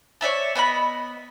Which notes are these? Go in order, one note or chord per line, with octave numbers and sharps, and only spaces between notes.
C#5 D5 E5 A5
B3 D#5 F#5 B5